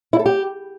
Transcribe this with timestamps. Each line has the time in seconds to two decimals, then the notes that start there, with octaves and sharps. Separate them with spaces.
0.13 E4
0.19 A4
0.26 G4